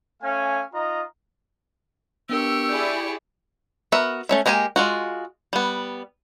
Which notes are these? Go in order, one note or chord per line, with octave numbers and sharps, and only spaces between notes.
A3 C#4 F5 G#5
D#4 F4 D#5 A#5
B3 D4 G4 A#4 C#6 E6
E4 G#4 D5 G6
B3 F#4 A#4 E5
A3 C#4 E5
G#3 A#3 G4 C5 G#5
G#3 F4 F#4
G3 B3